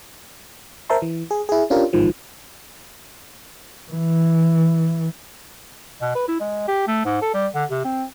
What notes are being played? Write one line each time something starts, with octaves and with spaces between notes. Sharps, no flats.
A#4 C5 E5 A5 C6
E3
G#4
E4 G#4
C#4 D4 F4 G4 A#4
A1 G#2 D#3 F3
E3
B2
B4
E4
G#3
G4
A3
G#2
A4
G3
D3
C3
C4